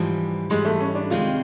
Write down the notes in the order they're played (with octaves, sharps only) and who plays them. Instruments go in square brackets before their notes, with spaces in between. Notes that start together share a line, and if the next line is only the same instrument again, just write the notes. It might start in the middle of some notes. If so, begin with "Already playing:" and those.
Already playing: [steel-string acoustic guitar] G#2 E3 G3 [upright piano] F3
[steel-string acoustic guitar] G#2 E3 G3 [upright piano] G#3
[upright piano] A3
C#4
D4
[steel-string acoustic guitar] C3 D#3 G#3 C4 [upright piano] F4